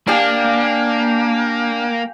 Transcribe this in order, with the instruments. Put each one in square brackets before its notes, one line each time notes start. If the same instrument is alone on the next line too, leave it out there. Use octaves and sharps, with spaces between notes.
[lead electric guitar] A#3 [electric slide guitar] D4 [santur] G4 F5 G#5